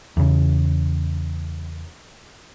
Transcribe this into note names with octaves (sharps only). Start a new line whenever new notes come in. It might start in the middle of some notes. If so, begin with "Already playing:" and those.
E2 C#3